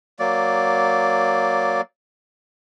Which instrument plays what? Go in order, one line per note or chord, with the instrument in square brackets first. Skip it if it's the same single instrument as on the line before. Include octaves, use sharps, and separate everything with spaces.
[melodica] F#3 A#3 D5